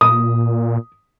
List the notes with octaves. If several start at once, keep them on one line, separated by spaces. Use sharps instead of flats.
A#2 D#6